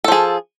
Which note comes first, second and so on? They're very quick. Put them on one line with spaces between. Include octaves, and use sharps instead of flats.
A4 F3 G#4